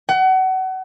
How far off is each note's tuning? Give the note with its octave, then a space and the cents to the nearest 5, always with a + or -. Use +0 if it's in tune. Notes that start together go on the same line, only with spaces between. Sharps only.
F#5 +30